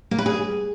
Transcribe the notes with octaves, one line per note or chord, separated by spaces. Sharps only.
A#3
B4
G#4